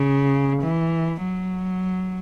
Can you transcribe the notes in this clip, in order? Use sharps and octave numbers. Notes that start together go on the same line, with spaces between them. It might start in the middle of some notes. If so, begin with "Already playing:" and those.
Already playing: C#3
E3
F#3